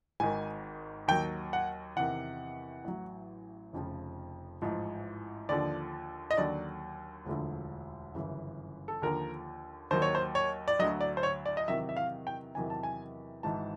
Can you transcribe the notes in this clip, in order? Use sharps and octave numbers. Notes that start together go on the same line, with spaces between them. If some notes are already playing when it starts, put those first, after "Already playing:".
G#1 G#2 D#3 G#5
D#2 D#3 F#3 G5
F#5
E2 C3 D#3 F#5
A1 A2 F#3
F1 F2 C#3 F3
A1 G#2 F3
D#2 D3 F3 D5
D#5
D#2 D3 F#3 D5
E1 D2 D3 F3
G1 F#2 C#3 E3
A4
D#2 D3 F3 A#4
D#2 D#3 F#3 C5
C#5
C5
C#5
D5
D2 D3 F#3 D#5
D5
C5
C#5
D5
D#5
E2 C3 D#3 F#3 E5
E5
F5
G5
E2 C3 D#3 F#3 G#5
A5
G#5
G#1 G#2 E3 A5